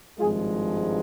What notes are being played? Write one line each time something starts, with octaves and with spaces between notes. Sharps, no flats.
G#1 G2 F3 G#3 F4 G#4